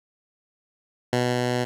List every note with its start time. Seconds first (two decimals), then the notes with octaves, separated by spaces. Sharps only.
1.13 B2